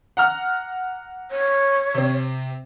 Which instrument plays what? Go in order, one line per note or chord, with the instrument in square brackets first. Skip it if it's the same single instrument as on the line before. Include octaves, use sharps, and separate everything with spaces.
[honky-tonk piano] F#5 A#5 F6
[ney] C#5
[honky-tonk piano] C3 C4